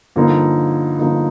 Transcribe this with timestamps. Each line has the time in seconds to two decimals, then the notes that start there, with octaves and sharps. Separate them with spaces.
0.16 G2 D3 F3 A#3 D#4
0.99 G2 D3 F3 A#3 D#4